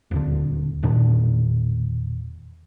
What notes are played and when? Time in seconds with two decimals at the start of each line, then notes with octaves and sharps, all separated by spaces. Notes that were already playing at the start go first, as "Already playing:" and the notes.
0.11 D#1 D2 D3
0.83 E1 A#2 D#3 D4